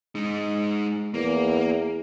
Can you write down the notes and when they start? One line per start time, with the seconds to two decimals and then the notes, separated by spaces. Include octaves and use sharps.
0.15 G#3 D#4
1.14 E2 A#3